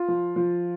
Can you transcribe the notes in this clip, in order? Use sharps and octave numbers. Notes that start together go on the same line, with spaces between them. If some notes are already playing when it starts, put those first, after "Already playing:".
Already playing: F4
F3
F3